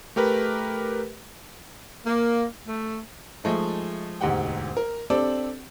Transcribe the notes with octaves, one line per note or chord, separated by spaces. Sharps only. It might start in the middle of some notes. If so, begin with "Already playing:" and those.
A3 G4 A#4 B4
A#3
A3
F3 G#3 A3 D#4
E1 D2 G#2 G4 F#5 G5
A#4
C4 D4 G4 A4 D5